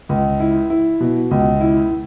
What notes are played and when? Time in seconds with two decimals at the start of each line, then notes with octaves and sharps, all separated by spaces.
0.09 C#2
0.40 E4
0.70 E4
1.00 B2
1.31 C#2
1.61 E4